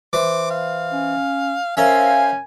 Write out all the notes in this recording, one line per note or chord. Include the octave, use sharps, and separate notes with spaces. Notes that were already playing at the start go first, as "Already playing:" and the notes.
E3 C5 D6
F5
C#4
C#4 A#4 C5 E5 F5 G#5